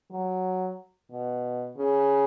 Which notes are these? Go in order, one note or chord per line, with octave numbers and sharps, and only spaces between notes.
F#3
B2
C#3